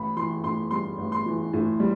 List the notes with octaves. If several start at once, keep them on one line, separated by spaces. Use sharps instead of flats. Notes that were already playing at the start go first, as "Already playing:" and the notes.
Already playing: A1 B5
E3 C6
A2 C6
G3 C6
A1
C6
E3
A2
G3